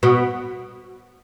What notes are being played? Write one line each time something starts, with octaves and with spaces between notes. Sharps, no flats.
B2